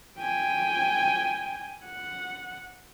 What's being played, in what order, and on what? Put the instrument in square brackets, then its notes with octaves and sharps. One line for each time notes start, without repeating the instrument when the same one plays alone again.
[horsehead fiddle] G5 G#5
F#5